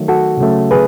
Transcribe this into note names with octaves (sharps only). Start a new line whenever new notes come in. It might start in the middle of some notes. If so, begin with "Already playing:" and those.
Already playing: D#3 F#3 A3
F#4 A4
C#3 F#3 A3
G#4 B4